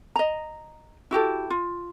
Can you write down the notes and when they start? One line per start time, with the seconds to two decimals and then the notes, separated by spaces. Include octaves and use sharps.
0.16 D#5 A#5
1.11 E4 F#4 G4 A4
1.50 F4